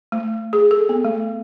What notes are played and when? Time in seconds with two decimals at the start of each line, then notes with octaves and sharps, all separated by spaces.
0.12 A3
0.53 G#4
0.71 A4
0.89 B3
1.05 A3